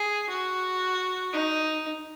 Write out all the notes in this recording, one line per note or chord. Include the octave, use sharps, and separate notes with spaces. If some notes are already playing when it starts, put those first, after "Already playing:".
Already playing: G#4
F#4
D#4